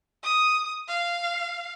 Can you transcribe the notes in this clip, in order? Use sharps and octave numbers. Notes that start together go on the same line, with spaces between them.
D#6
F5